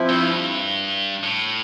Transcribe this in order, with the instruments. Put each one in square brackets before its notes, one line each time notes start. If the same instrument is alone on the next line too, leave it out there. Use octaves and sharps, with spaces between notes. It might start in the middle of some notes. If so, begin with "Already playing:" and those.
Already playing: [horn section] F3 C4 E4
[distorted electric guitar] G2
A2